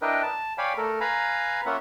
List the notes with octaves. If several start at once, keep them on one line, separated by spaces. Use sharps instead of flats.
D4 E4 A#4 B4 D#5 G5
A5
C#5 D5 F5 G5 G#5 B5
A3 A4 A#4
B4 F5 G#5 A#5 B5
A#3 C#4 F4 E5 F#5